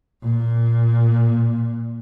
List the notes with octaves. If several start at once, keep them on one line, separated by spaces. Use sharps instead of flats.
A#2